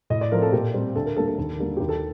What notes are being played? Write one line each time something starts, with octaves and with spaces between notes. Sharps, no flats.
A2 D#5
D5
F3 A3 C4 A#4
A4
A#2 G4
G3 C4
D2 A4
A#4
D3 G3 A#3 A4
A4
D#2
D3 G3 A#3
D#2 G4
A4